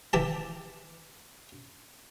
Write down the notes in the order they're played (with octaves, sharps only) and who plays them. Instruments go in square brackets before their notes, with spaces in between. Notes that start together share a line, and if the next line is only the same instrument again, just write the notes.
[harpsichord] E3 G4 A5